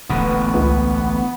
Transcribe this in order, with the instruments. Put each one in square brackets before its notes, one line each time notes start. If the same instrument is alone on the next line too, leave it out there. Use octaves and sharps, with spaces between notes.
[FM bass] D1 [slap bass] A1 A#2 D3 [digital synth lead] B3
[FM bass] C#2